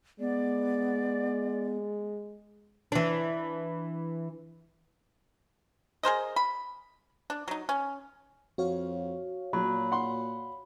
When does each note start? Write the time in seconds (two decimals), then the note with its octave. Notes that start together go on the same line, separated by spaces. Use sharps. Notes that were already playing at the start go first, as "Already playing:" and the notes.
0.20 G#3 B3 D5
2.92 E3 D4
6.03 G#4 A#4 C5 D#5
6.36 B5
7.30 D4
7.48 F#3 D#4
7.69 C#4
8.58 F2 F#4 C#5 F5
9.53 A#2 F#3 B5
9.92 F#5 C6